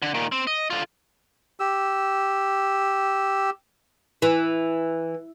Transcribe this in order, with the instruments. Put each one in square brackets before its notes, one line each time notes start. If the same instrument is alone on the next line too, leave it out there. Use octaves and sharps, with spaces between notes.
[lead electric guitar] D3
A#2 D#3
C4
D#5
D3 F4
[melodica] G4 E6
[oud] E3